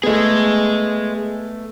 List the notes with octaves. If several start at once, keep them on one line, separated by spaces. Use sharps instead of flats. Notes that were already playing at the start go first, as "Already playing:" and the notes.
A3 B3 G#4 D#5